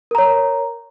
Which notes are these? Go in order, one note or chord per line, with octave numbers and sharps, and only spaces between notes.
A#4 C#5 A#5